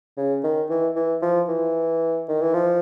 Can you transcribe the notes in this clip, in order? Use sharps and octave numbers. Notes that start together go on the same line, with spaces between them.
C#3
D#3
E3
E3
F3
E3
D#3
E3
F3